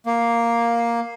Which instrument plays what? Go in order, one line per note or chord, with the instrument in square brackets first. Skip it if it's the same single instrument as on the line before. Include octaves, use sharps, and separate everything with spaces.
[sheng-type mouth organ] A#3